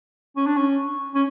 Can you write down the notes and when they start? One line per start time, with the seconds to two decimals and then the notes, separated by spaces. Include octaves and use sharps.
0.37 C#4
0.46 D4
0.57 C#4
1.15 C#4